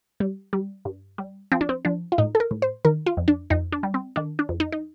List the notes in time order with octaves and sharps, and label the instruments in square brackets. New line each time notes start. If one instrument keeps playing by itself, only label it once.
[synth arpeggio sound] G3
G3
G2
G3
F3 C4
D4
C4
F3 D4
F4
A2 D#4
A4
A#4
A2
C5
D#3 A#4
F4
F2
D4
F2 D#4
D4
G3
C4
D#3 D4
D4
F2
D#4
D#4